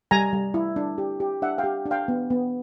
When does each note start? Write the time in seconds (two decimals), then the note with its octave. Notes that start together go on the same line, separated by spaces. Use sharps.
0.11 G3 G#5 A#5
0.33 G3
0.54 E4
0.76 D4
0.98 G4
1.20 G4
1.42 D4 E5 F#5
1.58 F5 G5
1.64 G4
1.86 D4
1.91 F5 G5
2.08 B3
2.30 B3